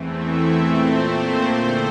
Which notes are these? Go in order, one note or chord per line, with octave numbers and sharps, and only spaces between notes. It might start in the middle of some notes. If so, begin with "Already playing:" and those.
Already playing: E2 E3 A3 C4
E5
A#2 A3 C4 C5
C5
E2 D3 A3 C4 C5